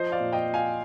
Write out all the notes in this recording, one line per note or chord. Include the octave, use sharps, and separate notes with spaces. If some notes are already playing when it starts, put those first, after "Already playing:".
Already playing: F3 C5 D#5
D5 F5
A#2
D#5 G5
F3
F5 G#5